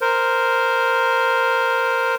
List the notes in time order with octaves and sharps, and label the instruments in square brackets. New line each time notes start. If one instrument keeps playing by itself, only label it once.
[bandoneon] A#4 C5